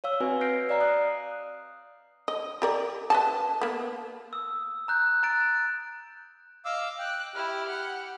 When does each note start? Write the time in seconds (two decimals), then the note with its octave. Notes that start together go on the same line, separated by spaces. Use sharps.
0.04 C#5 F5 E6
0.20 C4 F#4 B4 D#5 F5 G#5
0.41 F6 G6 A#6 C7 D7
0.69 D5 D#5 F5 A#5 F6 C7
0.81 D#6 F#6
2.28 D#5
2.62 G4 A#4 D5
3.10 B4 D#5 A5
3.61 A#3 B3
4.33 D#6 E6
4.88 A#5 F#6 G6
5.23 A#5 F#6 A6 D7
6.65 D#5 F5 D6 E6
6.99 G5 F#6
7.36 E4 G4 F6
7.69 F#5